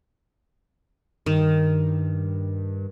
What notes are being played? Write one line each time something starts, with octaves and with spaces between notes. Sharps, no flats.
G2 D#3